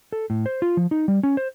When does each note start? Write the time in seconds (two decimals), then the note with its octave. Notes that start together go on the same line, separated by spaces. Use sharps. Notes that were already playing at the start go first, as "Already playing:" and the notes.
0.13 A4
0.30 A2
0.46 C5
0.62 F4
0.77 F3
0.91 D#4
1.08 G3
1.23 C#4
1.37 C5